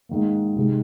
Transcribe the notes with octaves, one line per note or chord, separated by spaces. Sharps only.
G#2 D#3 A#3
C3 D#3 G#3